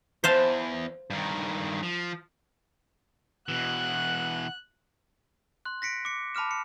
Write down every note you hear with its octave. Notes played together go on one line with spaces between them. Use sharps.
E2 C5 F5 A5
G2 D#3
F3
B2 E3 F#5 F#6
C6 F#6
A#6 B6 C#7 D7
D6 C#7
A5 B5 D6 F6 E7
C#7